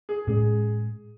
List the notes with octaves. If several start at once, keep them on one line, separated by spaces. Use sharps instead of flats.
G#4
A2 G#3 C#4 G#4